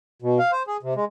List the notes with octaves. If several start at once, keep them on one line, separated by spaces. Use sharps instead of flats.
B2
F5
C5
G#4
C3
G#3